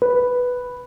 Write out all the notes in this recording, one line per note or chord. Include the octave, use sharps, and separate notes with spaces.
B4